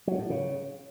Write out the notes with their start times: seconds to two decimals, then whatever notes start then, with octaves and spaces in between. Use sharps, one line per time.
0.07 F#3
0.19 A2
0.30 C#3